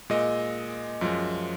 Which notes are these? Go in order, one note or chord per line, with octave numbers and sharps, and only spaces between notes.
A#2 G#3 D#5
F#2 F3 G#3